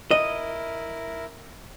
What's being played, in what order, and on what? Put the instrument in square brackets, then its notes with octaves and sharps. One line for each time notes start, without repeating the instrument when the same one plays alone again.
[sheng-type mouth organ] E4 A#4 [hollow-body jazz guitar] D#5